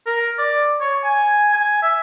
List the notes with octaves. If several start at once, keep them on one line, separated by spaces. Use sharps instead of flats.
A#4
D5
C#5
G#5
G#5
E5